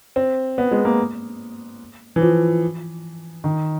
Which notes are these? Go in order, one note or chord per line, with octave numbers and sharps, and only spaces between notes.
C4
B3
G#3
A#3
E3
F3
D#3